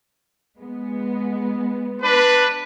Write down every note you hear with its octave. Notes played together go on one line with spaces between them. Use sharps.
G#3 B3
D4 B4